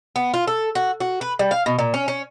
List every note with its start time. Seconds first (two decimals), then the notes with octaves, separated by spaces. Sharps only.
0.16 B3
0.34 F4
0.47 A4
0.75 F#4
1.00 F#4
1.21 B4
1.39 G3
1.51 F5
1.66 B2
1.79 A#2
1.94 C#4
2.08 C#4